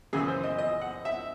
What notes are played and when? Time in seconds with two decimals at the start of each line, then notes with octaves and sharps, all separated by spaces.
0.13 F#2 C#3 E3 G#4
0.28 C5
0.43 D#5
0.58 D#5
0.81 F#5
1.05 E5